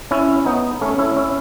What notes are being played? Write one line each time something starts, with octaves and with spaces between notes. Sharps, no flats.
C#4 E4
B3 D#4
A3 C#4
C#4 E4
C#4 E4